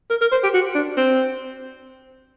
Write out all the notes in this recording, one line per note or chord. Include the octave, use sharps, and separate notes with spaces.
A#4
A#4
C5
G4
F#4
D4
C4